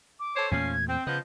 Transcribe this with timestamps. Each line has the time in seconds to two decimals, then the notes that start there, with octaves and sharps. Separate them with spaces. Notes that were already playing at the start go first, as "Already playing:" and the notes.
0.20 D6
0.36 A4 C5 C#5
0.51 E2 A#2 F3 A3 C#4 C7
0.72 G#6
0.88 C4 G5
1.07 C#3 F3 B3 D#5 G6